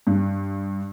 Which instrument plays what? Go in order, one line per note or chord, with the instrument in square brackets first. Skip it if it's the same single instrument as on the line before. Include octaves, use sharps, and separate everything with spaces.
[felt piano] G2